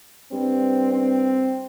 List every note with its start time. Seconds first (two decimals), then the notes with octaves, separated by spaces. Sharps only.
0.32 G2 C4
0.93 C4